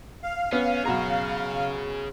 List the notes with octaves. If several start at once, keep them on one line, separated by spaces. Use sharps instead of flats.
F5
B3 C#4
F#2 B2 G#4 C#5 A#5